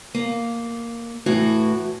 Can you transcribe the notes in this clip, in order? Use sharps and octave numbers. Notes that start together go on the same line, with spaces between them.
A#3
A2 E3 F#4